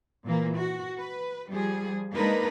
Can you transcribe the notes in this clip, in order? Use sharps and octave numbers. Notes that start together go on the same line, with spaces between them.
A#2 E3 A#3
F#4
B4
F3 G3 G#4
G#3 A#3 D4 D#4 A#4 B4